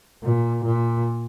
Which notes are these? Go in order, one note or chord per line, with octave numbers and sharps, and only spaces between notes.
A#2
A#2